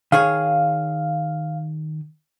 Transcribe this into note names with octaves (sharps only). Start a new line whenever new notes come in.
D#3 G#4 C#5 F5